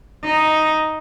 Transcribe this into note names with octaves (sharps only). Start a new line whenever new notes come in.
D#4